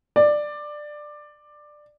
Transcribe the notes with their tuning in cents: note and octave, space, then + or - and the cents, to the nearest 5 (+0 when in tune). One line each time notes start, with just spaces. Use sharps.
D5 +15